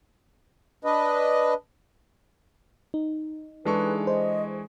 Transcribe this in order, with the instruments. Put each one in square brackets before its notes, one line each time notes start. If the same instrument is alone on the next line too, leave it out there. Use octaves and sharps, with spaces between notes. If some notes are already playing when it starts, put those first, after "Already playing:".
[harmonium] D4 B4 D#5
[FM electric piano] D#4
[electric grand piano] E3 G#3 C#6 [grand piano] D4 G#4 A4 [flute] B4
[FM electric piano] C5 [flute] D#5